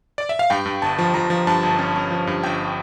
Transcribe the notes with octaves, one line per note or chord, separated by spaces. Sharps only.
D5
E5
F5
G2 G5
G2
G1 A5
F3
F3 A#5
F3
G2 A5
G1
C#4
C#4
F3
G2
G1 G5